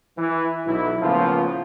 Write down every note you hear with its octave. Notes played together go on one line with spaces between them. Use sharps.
E3
B1 E4
A2 C#3 F3 A#3 B3 F4